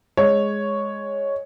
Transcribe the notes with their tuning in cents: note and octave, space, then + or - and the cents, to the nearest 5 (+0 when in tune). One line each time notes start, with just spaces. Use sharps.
G#3 +0 C#5 +0